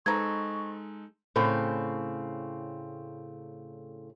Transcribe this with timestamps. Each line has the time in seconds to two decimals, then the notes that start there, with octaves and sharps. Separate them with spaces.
0.06 G#3 C4 D#4 A4 B4 A#5 C#6 G#6
1.36 A2 C#3 C4